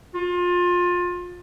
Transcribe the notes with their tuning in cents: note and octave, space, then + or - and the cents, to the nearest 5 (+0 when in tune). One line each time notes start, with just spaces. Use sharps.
F4 +25